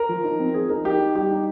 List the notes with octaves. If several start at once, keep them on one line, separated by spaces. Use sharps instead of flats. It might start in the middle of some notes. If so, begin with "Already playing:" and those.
Already playing: A#4
F3
D#4
C4
F3 G#4
D#4 A#4
D#4 G4
D#4
G3 G4
D#4